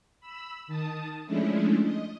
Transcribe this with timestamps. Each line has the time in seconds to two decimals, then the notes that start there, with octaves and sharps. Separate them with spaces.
0.21 B5 E6
0.67 D#3 A5 D#6
1.26 F3 G#3 A3 C#4 D4 E4
1.83 D#5